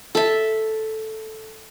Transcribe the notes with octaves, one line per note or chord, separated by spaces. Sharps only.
A4 E5